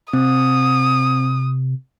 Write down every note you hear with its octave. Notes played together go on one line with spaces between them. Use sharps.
C3 C4 D#6